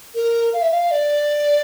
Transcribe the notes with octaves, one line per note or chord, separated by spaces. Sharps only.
A#4
F5
E5
F5
D5